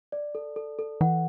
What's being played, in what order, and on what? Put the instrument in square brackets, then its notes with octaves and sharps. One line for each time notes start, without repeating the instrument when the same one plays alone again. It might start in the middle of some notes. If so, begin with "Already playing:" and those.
[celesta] D5
A4
A4
A4
[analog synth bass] E3 [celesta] F#5